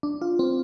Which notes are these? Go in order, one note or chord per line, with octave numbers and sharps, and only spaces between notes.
D4
F4
C4